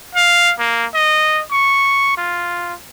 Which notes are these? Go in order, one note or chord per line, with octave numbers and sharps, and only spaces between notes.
F5
A#3
D#5
C#6
F4